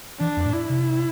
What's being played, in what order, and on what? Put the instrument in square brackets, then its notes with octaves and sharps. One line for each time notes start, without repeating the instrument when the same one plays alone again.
[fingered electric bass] E3 [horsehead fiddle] D4
[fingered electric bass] F2
A2
[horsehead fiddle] E4
[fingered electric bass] C3